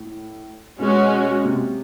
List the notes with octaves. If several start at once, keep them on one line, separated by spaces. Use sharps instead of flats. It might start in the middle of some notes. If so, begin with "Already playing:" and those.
Already playing: A2
B2 G#3 C#4 F#4
C3